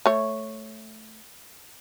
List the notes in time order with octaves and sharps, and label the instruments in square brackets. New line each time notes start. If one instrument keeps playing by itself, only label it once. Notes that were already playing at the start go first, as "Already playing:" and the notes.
[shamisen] A3 C#5